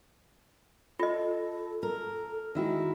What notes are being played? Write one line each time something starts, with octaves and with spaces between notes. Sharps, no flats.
F4 A4 D#5
A4 A#4
D#3 G#3 E4 F#4